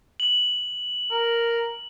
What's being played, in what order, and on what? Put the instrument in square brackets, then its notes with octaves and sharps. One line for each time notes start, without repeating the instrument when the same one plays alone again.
[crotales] F#7
[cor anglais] A#4